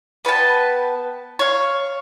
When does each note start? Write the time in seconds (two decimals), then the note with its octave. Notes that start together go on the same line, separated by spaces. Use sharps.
0.25 B3 B4 G5 A5
1.39 C#5 F5